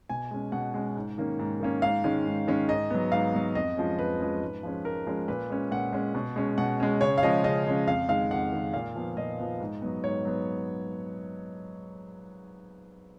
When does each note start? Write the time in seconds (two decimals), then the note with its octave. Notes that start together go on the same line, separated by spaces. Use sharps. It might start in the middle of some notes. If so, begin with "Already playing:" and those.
0.09 B2 G#5
0.31 G#3 C#4
0.52 B2 F#5
0.74 G#3 C#4
0.96 G#2
1.18 D#3 A#3 C#4
1.39 G#2
1.61 D#3 A#3 C#4
1.82 G#2 F5
2.04 D#3 G#3 C#4
2.26 G#2
2.47 D#3 G#3 C#4
2.68 G#2 D#5
2.90 F#3 B3
3.12 G#2 F5
3.34 F#3 B3
3.55 F2 D#5
3.77 F3 G#3 C#4
3.98 F2 B4
4.20 F3 G#3 C#4
4.42 G#2
4.63 F3 G#3 C#4
4.85 G#2 A#4
5.06 F3 G#3 C#4
5.28 A#2 B4
5.50 G#3 C#4
5.71 A#2 F#5
5.93 G#3 C#4
6.15 B2
6.36 G#3 C#4
6.58 B2 F#5
6.80 G#3 C#4
7.01 C#3 C#5
7.18 F5
7.23 F3 G#3 C#4 D#5
7.44 C#3 D#5
7.65 F3 G#3 C#4
7.87 F2 F5
8.08 D#3 G#3 F5
8.31 F2 F#5
8.53 D#3 G#3
8.74 A#2 F5
8.96 F3 B3
9.17 A#2 D#5
9.39 F3 B3
9.60 G#2
9.82 F#3 B3
10.04 G#2 C#5
10.25 F#3 B3